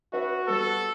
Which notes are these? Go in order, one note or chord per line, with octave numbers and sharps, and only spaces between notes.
C#4 F#4 B4 E5
G3 B3 A4